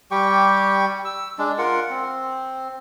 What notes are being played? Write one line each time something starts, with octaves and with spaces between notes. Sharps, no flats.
G3 G4 G5 C#6
E6
G#3 D4
F4 A#4 F#5
C4